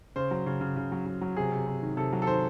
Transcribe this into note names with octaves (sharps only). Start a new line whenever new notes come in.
C#3 C5
F#3
C#3
C#3
C#3
F#3
F#3
F#3
C3 G#4
C3
C3
D#3
C3 A4
F#3
A4
D#3 C5